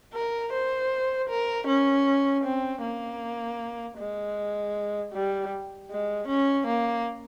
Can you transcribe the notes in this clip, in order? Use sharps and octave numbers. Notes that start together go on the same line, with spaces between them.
A#4
C5
A#4
C#4
C4
A#3
G#3
G3
G#3
C#4
A#3